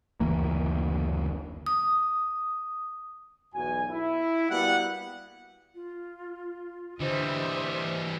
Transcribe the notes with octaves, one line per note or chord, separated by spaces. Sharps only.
F#1 D2 E3 A#3
D#6
B1 E2 B3 F#4 G#5
E4
G3 A#3 B3 F#4 B4 F#5
F4
D3 E3 G3 C5 D#5 E5